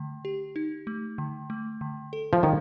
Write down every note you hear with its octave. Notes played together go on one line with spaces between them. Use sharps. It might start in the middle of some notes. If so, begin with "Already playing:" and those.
Already playing: D3 A3
G4
D#4
A3
D3
A3
D3
A4
F3
D#3 D#4